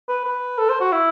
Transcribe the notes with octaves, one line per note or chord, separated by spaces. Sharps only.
B4
B4
A4
C5
F#4
E4